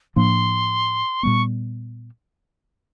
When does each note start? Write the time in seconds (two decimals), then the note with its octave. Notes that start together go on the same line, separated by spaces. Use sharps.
0.16 A2 F3 A#3 D4 C6
1.23 A#2 G3 B3 C#6